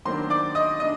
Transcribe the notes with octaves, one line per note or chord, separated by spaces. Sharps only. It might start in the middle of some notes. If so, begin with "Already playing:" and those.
D#3 F#3 A#3 D4 C5 C6
D5 D6
D#5 D#6
D4 D#5 D#6